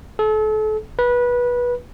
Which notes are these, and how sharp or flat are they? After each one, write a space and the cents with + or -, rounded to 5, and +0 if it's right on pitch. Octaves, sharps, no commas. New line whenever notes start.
A4 -35
B4 -20